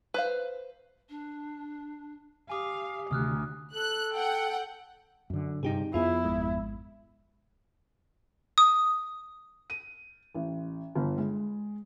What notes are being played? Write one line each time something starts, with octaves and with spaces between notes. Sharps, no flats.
B4 C5 F5
D4
G4 F5 G#5 D6 D#6
D2 C3 D#3 D#6 F6 F#6
A4 F#6
F#5 G5
F#2 D3
G2 C3 D#4 G4 G#4
F2 B3 E4 F4 G#4
G#1 G#3
D#6
D#7
A1
G1
G#3